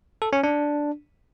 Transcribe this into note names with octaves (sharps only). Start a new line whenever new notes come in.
A4
C#4
D4